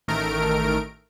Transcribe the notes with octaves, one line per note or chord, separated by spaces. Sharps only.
A1 D#3 A3 A#4 D7